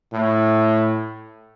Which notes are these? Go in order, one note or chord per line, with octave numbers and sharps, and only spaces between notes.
A2